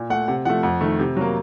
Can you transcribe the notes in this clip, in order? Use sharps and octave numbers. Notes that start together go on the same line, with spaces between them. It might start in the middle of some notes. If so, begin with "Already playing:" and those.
Already playing: A#2
A3 F#5
C3 F#5
F3 A3 F#5
F2 F#5
D#3 A3
C3
F#3 A#3